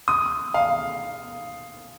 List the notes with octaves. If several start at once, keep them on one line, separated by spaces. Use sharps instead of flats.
D#6
F5